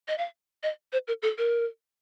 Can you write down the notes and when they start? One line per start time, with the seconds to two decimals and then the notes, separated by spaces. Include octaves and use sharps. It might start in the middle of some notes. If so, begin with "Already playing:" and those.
0.08 D#5
0.18 F5
0.63 D#5
0.93 C5
1.08 A#4
1.22 A4
1.38 A#4